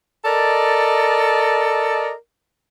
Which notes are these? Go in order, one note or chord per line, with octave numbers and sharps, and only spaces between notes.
A4 A#4 D5 D#5